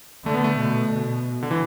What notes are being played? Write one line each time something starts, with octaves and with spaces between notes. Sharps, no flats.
D3 A3
B3
A3
B2
B2
D3
E3